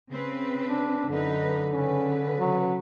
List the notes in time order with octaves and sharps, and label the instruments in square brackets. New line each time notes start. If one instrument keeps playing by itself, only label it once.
[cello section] C#3 C4 B4
[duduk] D4
[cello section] F#2 D#4 B4 [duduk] D3
[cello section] C#3 B4 [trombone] C#4
[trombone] F#3